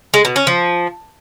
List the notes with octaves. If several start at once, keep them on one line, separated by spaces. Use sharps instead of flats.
G#3
B2
C#4
F3